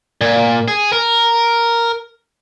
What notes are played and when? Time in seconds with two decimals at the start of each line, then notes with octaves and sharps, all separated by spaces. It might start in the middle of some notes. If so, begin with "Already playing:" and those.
0.21 A#2
0.68 G#4
0.93 A#4